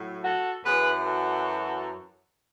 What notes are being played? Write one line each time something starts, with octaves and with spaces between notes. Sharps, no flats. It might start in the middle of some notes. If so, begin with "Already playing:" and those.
Already playing: A2 F#3
F#4 A4
F#2 E3 G#4 B4
F#4 A4